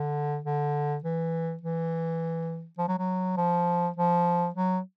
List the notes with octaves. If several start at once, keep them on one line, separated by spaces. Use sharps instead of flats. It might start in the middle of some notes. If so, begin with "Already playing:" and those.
Already playing: D3
D3
E3
E3
F3
F#3
F#3
F3
F3
F#3